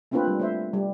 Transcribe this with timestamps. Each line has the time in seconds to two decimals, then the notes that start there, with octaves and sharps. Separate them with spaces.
0.11 A3 A#3 C4 D4 F4 B4
0.24 G3 F4
0.40 A3 C5 E5
0.73 G3